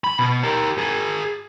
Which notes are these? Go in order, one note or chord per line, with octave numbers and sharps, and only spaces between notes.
B5
B2
G4 A#4
G#4 A#4